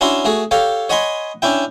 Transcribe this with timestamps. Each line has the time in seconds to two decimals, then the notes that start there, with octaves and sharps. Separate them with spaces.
0.01 C#4 D4 E4 F#4 C6
0.25 A3 F#4 G#4
0.51 G4 A4 C#5 F5
0.89 C#5 D#5 F#5 G#5 B5 C6
1.42 C#4 D4 E4 G5